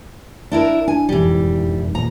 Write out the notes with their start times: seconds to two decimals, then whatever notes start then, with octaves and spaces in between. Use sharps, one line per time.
0.51 D4 E4 A#4
0.88 D4 G#5
1.09 E1 F2 G#2 E3 G3
1.95 D#2 A#2 A#5